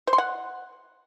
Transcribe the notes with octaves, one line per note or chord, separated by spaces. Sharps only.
C5
C6
F#5